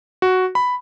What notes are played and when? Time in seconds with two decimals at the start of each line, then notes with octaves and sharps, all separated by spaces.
0.22 F#4
0.55 B5